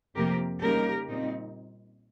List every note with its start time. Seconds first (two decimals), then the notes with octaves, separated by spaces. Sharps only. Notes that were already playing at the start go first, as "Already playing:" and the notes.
0.15 F2 C3 F3 A#3 G4 A#4
0.61 C#3 G3 A#3 D#4 G4 A#4
1.08 A#2 G3 C4 D#4